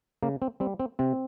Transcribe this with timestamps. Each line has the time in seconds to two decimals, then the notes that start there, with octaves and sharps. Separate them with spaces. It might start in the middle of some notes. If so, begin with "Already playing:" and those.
0.23 C#3 A#3
0.42 C4
0.60 G3 C4
0.80 C4
0.99 C3 C4